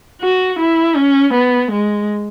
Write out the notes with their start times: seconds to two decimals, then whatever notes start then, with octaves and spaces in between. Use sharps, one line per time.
0.21 F#4
0.59 E4
0.96 C#4
1.34 B3
1.72 G#3